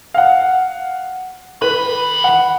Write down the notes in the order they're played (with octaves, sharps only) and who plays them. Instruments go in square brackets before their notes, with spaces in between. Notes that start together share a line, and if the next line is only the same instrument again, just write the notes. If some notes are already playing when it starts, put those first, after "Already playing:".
[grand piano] F5 F#5
[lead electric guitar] D#3 B5 [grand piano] B4
[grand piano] F#5